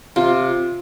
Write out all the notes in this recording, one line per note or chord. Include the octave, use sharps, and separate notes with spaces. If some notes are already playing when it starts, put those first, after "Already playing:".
C3 F4